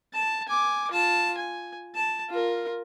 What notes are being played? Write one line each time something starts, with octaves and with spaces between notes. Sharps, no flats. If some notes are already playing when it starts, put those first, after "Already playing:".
A5
G#5 D6
F4 A5
G#5
A5
F4 A#4